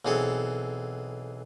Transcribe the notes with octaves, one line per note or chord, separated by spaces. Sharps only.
B1 E3 C4 G#4 A4